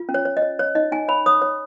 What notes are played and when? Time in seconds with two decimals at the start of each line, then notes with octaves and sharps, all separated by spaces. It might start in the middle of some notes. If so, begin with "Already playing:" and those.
Already playing: F4
0.09 C#4
0.14 C#5
0.25 C#5
0.37 D#5
0.42 C#5
0.59 C#5
0.75 D#4 D#5
0.92 D#4 G#5
1.08 C#5 B5
1.26 C#5 D#6
1.42 C#5